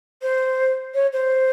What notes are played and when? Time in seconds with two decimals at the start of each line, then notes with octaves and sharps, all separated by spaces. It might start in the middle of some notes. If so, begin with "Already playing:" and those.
0.22 C5
0.94 C#5
1.12 C5